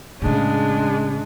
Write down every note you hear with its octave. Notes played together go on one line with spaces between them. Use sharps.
A2 C#3 G#3 D4